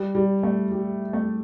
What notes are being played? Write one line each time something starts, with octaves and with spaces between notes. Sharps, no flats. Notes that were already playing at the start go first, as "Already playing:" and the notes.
Already playing: G3
G3
A3
G3
A3